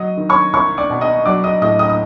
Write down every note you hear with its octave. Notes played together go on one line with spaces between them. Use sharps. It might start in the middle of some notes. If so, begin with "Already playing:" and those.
Already playing: F#3 D#5 D#6
D#3
C#5 C#6
C2 C#5 C#6
D5 D6
B2
D#5 D#6
F#3 D5 D6
D#5 D#6
A2 D#5 D#6
D#5 D#6
D#6